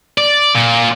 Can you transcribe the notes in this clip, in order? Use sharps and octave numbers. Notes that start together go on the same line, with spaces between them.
D5
A#2